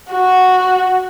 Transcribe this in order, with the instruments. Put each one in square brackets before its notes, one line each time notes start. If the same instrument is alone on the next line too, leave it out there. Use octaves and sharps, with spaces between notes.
[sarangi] F#4